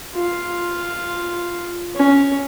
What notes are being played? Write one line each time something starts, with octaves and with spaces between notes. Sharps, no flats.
F4
C#4